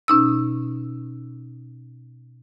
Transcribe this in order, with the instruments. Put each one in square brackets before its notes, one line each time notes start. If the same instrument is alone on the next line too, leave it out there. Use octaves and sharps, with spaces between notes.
[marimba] B2 C#4 D#4 E6